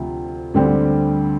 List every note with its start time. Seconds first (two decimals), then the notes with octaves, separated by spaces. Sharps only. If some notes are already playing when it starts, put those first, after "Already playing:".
Already playing: D2 C3 F3
0.54 D2 D3 G3 C4